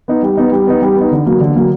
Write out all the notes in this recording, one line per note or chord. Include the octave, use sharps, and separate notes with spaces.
B3 D#4
G3
B3 D#4
G3
B3 D#4
G3
B3 D#4
D3
F#3 A#3
D3
F#3 A#3